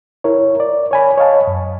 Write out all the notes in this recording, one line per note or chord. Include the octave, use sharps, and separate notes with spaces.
E4 A#4 C#5
D5
C#5 G#5 B5
C#5 D#5 F5 A5
F#2